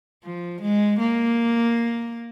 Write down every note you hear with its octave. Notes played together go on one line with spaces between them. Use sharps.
F3
G#3
A#3